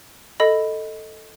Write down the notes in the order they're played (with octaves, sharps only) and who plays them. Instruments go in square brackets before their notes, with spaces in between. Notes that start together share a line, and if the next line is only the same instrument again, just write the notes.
[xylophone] A4 D#5 B5